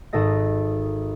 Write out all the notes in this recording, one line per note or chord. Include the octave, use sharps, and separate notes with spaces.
G#1 A4 D#5 A#6